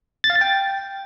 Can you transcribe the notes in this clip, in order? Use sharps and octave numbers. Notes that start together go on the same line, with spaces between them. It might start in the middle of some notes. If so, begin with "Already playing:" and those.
A6
F5
A6
G5